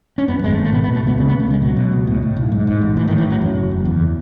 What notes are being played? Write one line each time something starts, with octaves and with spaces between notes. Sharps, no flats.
C#4
F#2 B3
G#1 G#3
A3
G#1
A3
B2 B3
B3
B2
A3
C#2 B3
C#3 B3
B3
C#3
A3
C#2 G#3
B2 F#3
B2
C#2
A2
A2
B1
G#2
G#2
A1
A2 E3
D#3
A2
E3
A1 F#3
F#2 F#3
F#1
F#1
E2